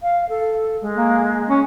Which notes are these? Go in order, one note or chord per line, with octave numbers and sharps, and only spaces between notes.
F5
A4
G#3
A#3
C#4